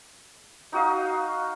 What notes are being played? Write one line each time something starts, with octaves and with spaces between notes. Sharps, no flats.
D#4 F#4 D#5 F5